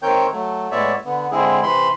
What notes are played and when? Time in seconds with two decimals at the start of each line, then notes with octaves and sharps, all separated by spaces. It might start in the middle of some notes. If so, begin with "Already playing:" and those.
0.03 D#3 C4 A#4 C#5 G5 G6
0.32 F#3 A3
0.71 A2 G#3 B3 C#5 D5 E5
1.05 D3 B3
1.32 D3 G#3 C4 E4 G#4
1.63 C3 E3 B5 C6